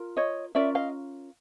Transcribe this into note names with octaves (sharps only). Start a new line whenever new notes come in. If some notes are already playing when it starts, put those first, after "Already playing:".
Already playing: F4 A#4
C#5 D#5
C#4 F4 A#4 D5 E5
D#5 F5